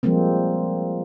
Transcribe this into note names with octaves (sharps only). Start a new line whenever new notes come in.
F3 G3 G#3 A#3 C4